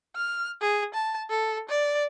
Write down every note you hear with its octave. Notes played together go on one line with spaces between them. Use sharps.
F6
G#4
A5
A4
D5